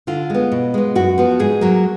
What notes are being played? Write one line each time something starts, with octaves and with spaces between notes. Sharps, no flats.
D3 F4
G#3 B3
B2
G#3 B3
F#2 F#4
F3 B3
G#2 G#4
F#3 A#3